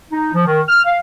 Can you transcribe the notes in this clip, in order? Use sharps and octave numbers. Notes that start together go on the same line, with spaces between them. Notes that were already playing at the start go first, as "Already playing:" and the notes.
D#4
F3
D#3
F6
F5